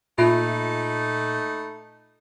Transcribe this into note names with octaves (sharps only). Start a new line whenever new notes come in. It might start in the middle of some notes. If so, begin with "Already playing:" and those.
A#2 A3 D#4 F4 E5 B5